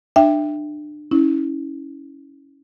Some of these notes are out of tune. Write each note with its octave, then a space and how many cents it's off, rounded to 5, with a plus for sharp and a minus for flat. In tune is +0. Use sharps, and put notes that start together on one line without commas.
D4 +30 E5 +10 G5 +10
C#4 +0 E4 -30